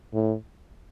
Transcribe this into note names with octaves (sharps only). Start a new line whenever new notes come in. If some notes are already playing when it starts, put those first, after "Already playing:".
A2